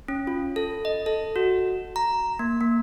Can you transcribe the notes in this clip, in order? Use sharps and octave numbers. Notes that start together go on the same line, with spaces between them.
C#4
F4
A4
D#5
A4
F#4
A#5
A#3
A#3